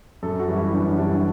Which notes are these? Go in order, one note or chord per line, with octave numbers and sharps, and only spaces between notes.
F#2 A4
F#4
E3 G3
E4
F#2 D4
C#4
E3 G3 D4
E4